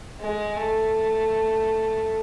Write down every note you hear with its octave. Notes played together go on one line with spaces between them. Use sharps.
G#3
A3